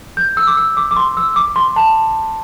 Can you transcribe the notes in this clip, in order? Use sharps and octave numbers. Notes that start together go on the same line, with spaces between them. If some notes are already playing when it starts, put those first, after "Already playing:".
G6
E6
D6
E6
D6
D6
C6
E6
D6
C6
A5